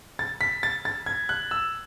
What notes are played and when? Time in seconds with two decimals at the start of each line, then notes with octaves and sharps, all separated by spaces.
0.19 A6
0.41 B6
0.63 A6
0.85 A6
1.06 G#6
1.29 F#6
1.51 E6